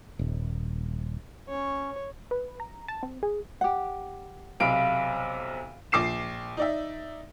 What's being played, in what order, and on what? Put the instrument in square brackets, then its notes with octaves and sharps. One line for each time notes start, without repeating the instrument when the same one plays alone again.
[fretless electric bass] D#1
[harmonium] C#4 [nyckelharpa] C#5
[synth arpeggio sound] B4
A#5
A5
C4
G#4
[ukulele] G4 F#5
[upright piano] B1 C3 D7 [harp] F5 B5
[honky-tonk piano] A#1 D6 C7 E7
D#4 D5 E5